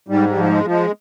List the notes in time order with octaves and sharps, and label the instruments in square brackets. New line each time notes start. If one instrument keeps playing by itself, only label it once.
[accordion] G#2 G3
G3
F3
G3
G#3
F3
G#3